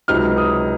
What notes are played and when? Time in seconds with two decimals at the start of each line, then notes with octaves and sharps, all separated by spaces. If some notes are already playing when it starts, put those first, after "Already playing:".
0.08 C#2 C3 F#3 C4 D#4 F6
0.37 D#6